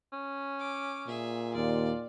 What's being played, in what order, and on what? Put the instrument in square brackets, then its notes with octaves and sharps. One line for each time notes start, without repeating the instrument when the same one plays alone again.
[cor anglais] C#4
[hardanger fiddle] D6
[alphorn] A#2 [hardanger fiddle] G#4 E5
[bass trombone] D#2 [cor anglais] F4 [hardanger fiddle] D5